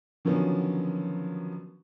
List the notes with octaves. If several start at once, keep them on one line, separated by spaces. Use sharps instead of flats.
D3 D#3 F3 F#3 B3 C#4